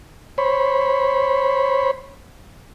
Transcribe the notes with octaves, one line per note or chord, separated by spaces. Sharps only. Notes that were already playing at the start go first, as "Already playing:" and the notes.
C5 C#5 B5